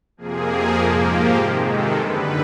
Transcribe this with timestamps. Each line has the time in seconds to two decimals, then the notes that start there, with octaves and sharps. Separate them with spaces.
0.17 F2 C3 F3 A#3 G#4
0.77 G#2 F3 A#3 G4
1.06 G4
1.36 C3 D#3 G#3
1.65 A4
1.95 F#2 D3 G3 B4